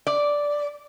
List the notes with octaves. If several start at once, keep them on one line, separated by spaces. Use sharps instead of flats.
D5